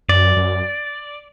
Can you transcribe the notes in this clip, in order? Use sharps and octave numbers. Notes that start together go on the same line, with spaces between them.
F#2 D5
F#2